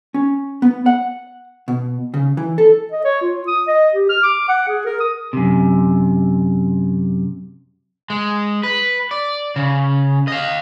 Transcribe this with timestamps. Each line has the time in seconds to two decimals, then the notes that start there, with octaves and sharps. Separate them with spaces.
0.14 C#4
0.62 B3
0.86 F#5
1.68 B2
2.14 C#3
2.37 E3
2.58 A4
2.92 D#5
3.04 C#5
3.22 F4
3.48 D#6
3.68 D#5
3.94 G4
4.10 F6
4.23 D6
4.49 F#5
4.68 G#4
4.86 A#4
5.00 D#6
5.33 F#2 C3
8.10 G#3
8.63 B4
9.11 D5
9.56 C#3
10.28 D#5 F5